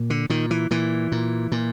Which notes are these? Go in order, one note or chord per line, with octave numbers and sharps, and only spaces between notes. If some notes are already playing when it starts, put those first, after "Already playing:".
Already playing: A#2
D3
A#2 D#3
E3
A#2 E3
A#2
A#2